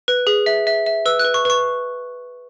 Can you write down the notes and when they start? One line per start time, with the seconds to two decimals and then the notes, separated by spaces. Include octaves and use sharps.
0.08 B4
0.27 G#4
0.46 E5
0.67 E5
0.86 E5
1.06 B4 E6
1.19 F#6
1.24 B4
1.34 C#6
1.45 B4 C#6